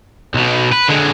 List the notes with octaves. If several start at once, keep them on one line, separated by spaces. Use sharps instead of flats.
B1 B2
B4
D3 G#3